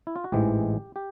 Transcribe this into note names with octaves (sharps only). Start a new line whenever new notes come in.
E4
F4
F#4
A1 G#2 E3 G#3 G4
G4